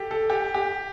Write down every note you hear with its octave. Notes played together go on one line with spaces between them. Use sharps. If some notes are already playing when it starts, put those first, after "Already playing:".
Already playing: G4 A4
A4
G4
G4